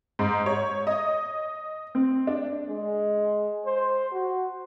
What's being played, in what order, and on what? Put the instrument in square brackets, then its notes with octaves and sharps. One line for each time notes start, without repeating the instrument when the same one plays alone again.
[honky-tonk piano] G#2
C#5
D#5
C4
D4
[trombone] G#3
C5
F#4